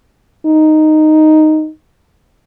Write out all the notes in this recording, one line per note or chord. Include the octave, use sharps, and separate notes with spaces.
D#4